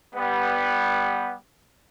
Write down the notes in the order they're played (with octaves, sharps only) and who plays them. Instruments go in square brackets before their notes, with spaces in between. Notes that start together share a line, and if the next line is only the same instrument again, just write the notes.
[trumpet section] G3 B3